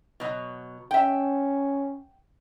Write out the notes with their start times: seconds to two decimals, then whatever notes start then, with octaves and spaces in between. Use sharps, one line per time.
0.20 B2 F#3
0.91 C#4 E5 G5